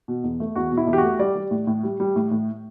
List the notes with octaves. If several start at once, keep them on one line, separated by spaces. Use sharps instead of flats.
B2
E2
A3
E2 F#4
B2
E4
E2
G4
F#4
A3
G3 D5
G3
A2
A2
G3
G3
A2
A2